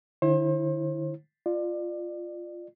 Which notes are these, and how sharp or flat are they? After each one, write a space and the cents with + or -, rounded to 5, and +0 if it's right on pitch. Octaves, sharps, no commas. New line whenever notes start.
D3 +45 E4 +0 C5 +35
F4 -5 D5 +30